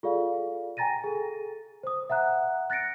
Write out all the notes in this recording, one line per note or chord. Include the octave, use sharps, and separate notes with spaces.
F4 G#4 A4 D5 F5
G5 G#5 A#5 A6 A#6 D#7
G#4 A4
C5 D#6
E5 F#5 A#5 F#6
F#6 A6 A#6 C#7 D7